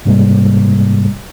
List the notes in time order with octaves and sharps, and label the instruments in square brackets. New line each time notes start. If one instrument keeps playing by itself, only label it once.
[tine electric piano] G#2 C3 G3 G#3 A#3